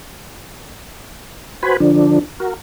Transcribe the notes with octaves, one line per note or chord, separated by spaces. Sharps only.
F#4 B4 C5 G#5 B5
D3 F3 D4
F#4 A#4